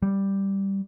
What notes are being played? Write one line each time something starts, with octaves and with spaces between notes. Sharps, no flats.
G3